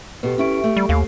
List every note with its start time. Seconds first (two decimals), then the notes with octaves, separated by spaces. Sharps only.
0.23 B2 G4 A4 B4
0.38 C#4 E4 G4 C#6 D7
0.64 A3
0.77 G3
0.89 D#2 F5